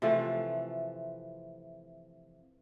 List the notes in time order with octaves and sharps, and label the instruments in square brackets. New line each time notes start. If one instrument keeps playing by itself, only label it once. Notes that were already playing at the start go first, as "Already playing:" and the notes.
[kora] C3 E3 F3 A3